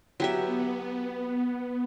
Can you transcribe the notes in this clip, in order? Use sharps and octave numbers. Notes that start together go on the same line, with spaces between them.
F#3 B3 G4 E5